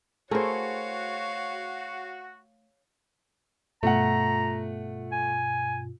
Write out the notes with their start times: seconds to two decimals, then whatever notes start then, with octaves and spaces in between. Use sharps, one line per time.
0.31 A3 E4 F#4 G#4 A#4 C5 C#5 F5
3.83 G2 B2 A3 F4 F#5 A#5
5.12 G#5